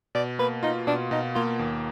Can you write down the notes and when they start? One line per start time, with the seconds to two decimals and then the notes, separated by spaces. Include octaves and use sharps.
0.15 B2 D5
0.39 A#3 B4
0.63 D#4 F4
0.87 B2 D4
1.11 B2 D#4
1.35 A#3 F4
1.59 D#2